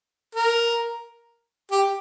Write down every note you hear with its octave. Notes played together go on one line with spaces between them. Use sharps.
A#4
G4